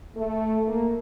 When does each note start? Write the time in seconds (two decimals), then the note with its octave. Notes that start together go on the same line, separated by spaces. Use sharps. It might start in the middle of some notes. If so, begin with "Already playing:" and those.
0.16 A3
0.68 A#3